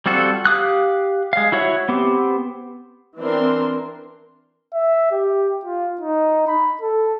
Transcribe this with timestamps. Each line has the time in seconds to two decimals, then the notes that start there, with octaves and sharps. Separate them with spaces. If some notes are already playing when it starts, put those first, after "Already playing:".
0.06 G3 C4 F4 F#4 A4
0.45 G4 F5 D#6 F#6
1.33 G#3 F5
1.52 E4 F#4 C#5 E5 F#5
1.89 B3 C4 G4
3.19 E3 C4 D4 A#4 C6
4.74 E5
5.11 G4
5.65 F4
6.01 D#4
6.47 B5
6.81 A4